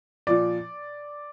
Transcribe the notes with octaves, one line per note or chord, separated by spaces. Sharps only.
A#2 F3 D5